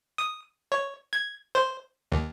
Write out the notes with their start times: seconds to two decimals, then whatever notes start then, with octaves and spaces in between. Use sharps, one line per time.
0.18 D#6
0.72 C#5
1.13 G#6
1.55 C5
2.12 D#2